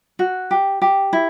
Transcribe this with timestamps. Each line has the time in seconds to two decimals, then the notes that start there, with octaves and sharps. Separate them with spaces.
0.19 F#4
0.51 G4
0.82 G4
1.13 E4